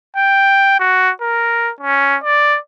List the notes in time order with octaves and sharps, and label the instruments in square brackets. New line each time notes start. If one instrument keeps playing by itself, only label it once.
[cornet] G5
F#4
A#4
C#4
D5